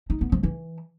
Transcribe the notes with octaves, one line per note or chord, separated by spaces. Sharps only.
D#4
B3
F3
E3